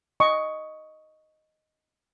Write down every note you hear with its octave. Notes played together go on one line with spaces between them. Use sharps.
D#5 C#6